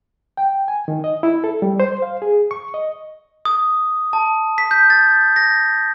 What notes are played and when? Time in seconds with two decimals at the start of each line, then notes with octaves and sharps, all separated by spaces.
0.37 G5
0.68 G#5
0.88 D#3
1.04 D#5
1.23 E4
1.44 A4
1.62 G3
1.80 C5
2.02 F5
2.22 G#4
2.51 C#6
2.74 D#5
3.45 D#6
4.13 A5
4.58 B6
4.71 G6
4.90 A6
5.36 A#6